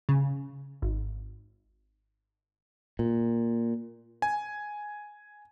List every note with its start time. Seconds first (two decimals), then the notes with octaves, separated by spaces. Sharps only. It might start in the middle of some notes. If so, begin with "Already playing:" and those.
0.09 C#3
0.82 G#1
2.99 A#2
4.22 G#5